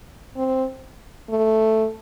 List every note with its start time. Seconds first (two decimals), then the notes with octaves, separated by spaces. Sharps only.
0.37 C4
1.30 A3